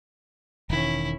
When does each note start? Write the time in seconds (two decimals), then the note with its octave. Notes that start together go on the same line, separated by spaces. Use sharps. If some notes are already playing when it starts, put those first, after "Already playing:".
0.70 E1 D#3 C#4 E4